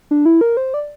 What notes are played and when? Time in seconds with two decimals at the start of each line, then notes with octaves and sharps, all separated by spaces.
0.11 D4
0.26 E4
0.41 A#4
0.57 C5
0.74 D5